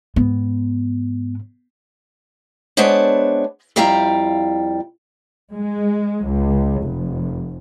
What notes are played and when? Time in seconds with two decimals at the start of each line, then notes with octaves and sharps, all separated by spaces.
0.16 G#2 B3
2.77 G#3 B3 D4 C5 C#5 A5
3.76 F2 G3 E4 F5 G5 A#5
5.55 G#3
6.29 C#2
6.84 F1